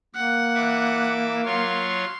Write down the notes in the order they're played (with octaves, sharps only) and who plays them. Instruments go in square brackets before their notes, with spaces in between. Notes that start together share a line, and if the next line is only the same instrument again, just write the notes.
[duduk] A#3 [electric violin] F#5
[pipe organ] E3 E5 D6
[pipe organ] F#3 F4 C#5 [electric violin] C6